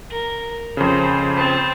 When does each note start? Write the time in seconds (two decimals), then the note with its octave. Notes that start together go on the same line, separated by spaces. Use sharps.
0.10 A#4
0.77 F2 C#3 C5
1.37 C4 A5